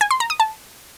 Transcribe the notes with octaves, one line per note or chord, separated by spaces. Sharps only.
G#5
C6
A#5
D#6
A5